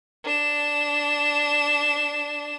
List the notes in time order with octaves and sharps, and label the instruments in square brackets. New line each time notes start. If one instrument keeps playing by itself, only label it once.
[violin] D4 E7